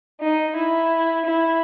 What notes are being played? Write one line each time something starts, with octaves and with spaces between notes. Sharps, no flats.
D#4
E4
E4